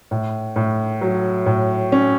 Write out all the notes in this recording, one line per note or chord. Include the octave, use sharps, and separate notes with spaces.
A2
A2
F#3
A2
C#4